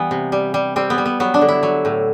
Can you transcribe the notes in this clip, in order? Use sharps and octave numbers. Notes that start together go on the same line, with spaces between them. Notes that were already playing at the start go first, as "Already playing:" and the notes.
Already playing: E3 G3 B3
C3
G3
G3
G3 C4
B3
G3
B3
F#3 B3
D4
D3
E4
F#3
A2